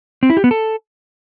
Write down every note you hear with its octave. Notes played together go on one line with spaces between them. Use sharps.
C4
E4
G4
B3
A4